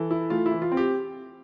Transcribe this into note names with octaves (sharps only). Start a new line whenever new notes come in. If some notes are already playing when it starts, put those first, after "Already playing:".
Already playing: E3 A4
E4
A3 F4
E4
E3
F4
C4
G4